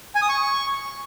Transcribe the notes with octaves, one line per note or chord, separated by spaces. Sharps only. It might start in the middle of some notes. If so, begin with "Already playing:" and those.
G#5
D#6
C#6